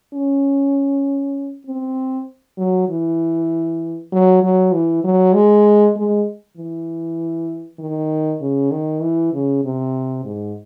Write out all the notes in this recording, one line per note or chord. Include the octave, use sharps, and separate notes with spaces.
C#4
C4
F#3
E3
F#3
F#3
E3
F#3
G#3
G#3
E3
D#3
C#3
D#3
E3
C#3
C3
G#2